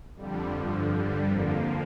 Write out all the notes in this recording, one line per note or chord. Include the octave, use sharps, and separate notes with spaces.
F2 D3 G3
G2 D3 F3
G2 D3 G3
F2 D3 F3 A#3